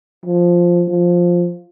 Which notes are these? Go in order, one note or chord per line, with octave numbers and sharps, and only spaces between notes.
F3
F3